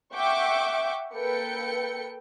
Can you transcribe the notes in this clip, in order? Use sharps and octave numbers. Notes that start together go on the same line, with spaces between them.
E5 F#5 G5 C#6 D6
A#3 A4 B4 G5 C#7